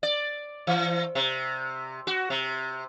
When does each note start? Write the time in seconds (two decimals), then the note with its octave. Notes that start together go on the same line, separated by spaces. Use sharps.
0.03 D5
0.67 E3
1.15 C3
2.07 F#4
2.30 C3